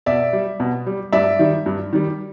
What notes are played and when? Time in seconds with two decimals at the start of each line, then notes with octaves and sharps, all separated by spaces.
0.06 B2 D5 E5
0.33 G3
0.60 B2
0.87 G3
1.12 G2 D5 E5
1.39 D#3 G3
1.66 G2
1.93 D#3 G3